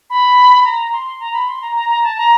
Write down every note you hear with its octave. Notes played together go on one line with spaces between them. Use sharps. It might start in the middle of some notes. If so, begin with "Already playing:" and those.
B5
A#5
C6
A#5
B5
C6
A#5
A#5
A#5
A5
A#5